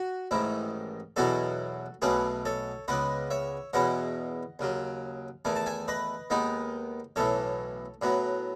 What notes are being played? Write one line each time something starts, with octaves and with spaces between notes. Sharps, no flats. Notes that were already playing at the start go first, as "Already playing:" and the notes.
Already playing: F#4
A1 G#2 D#3 E4
E2 B2 F#3 C#4 E4 F#4 A4
B1 B2 A3 C#4 G#4 B4
A4 C#5
C#2 C#3 G#3 B3 B4 D#5
C#5 E5
E2 B2 G#3 C#4 E4 D#5 F#5
D#2 C#3 F#3
E2 D#3 A3 G#5
A5
E5 G#5
B4 D#5
D#2 D#3 G#3 B3 D#4
B1 A2 E3 A4 C#5
A2 F#3 B3